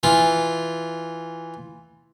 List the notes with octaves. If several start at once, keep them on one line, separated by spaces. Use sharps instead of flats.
E3 F4